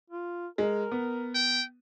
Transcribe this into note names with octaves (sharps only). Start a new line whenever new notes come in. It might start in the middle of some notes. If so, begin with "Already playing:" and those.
F4
G#3 A#4
B3
G5